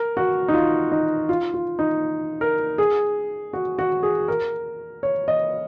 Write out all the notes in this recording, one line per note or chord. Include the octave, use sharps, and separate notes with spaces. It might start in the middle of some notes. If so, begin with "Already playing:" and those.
Already playing: A#4
F#4
D#4
F4
D#4
F4
F4
D#4
A#4
G#4
F#4
F#4
G#4
A#4
C#5
D#5